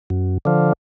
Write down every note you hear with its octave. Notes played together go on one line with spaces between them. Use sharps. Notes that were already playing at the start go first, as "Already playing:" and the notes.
F#2
D3 F3